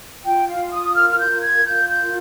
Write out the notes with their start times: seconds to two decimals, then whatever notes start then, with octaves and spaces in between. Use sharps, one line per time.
0.25 F4 G5
0.48 F5
0.60 F4
0.71 D#6
0.95 A#4 F6
1.10 F6
1.19 G6
1.30 F4
1.42 G#6
1.65 F4 G6
1.89 G6
2.01 A#4